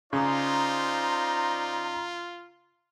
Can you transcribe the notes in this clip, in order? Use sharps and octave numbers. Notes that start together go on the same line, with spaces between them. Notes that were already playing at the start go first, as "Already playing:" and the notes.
C#3 D#4 F4 C5 D5 A#5